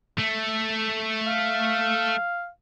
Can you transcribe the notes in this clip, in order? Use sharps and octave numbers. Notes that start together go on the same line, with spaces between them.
A3
F5